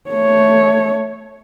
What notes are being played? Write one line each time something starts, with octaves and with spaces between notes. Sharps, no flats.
A3 C#5